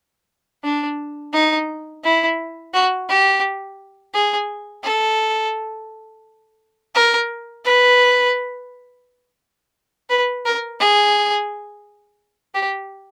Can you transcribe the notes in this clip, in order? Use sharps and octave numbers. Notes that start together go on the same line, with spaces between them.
D4
D#4
E4
F#4
G4
G#4
A4
A#4
B4
B4
A#4
G#4
G4